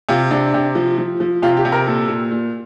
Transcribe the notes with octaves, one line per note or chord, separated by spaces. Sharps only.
C3 F4
C3 D4
C3
F3
F3
F3
C3 F4
G4
C3
A#4
A#2 A4
A#2
A#2